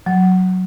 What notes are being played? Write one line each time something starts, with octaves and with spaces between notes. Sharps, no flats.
F#3